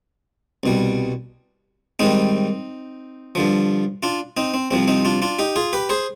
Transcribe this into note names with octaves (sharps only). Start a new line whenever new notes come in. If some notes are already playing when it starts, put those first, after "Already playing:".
C2 B2 G3
G#2 D#3 G3 C4 D#4
G2 D3 F3
D4 F4
C4 D#4
C4
C2 C3 F3 C4
C4 D#4
D4 F4
D4 F4
D#4 G4
F4 G#4
G4 B4
G#4 C5